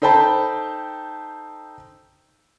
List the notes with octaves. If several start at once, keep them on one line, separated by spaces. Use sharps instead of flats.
D#4 A4 C5 G5 A5 B5